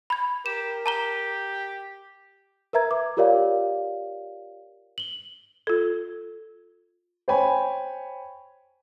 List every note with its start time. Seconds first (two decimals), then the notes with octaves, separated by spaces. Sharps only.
0.10 B5 G#6
0.46 G4 A#4 E7
0.86 G4 A5 A#5 G7
2.73 A#4 B4 E5 A#5 G#6
2.91 D6
3.17 F4 G4 A#4 C#5 D5 F5
4.98 F#7 G7
5.67 F4 A4
7.28 C5 C#5 G5 G#5 B5